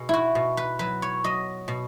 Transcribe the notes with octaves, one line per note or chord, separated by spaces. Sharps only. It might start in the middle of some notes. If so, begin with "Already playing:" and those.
Already playing: B2 G#4
E4 F#4
B2
B4
F#3 B4
C#5
F#3 D#5
B2